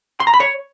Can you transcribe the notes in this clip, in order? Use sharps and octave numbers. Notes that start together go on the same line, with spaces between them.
C6
A#5
B5
C#5